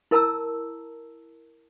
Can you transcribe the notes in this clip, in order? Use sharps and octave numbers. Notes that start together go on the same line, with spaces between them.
E4 A#4 A5 A#5 E6